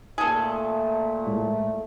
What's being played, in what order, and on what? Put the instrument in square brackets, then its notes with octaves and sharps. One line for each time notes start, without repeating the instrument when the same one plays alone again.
[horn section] A#2 [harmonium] A3 [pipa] G#4 A4
[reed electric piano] A2 G#3